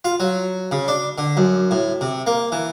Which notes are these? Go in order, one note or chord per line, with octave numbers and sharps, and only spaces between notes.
F4
F#3
C#3
D4
D3
F#2
A2
C3
A#3
E3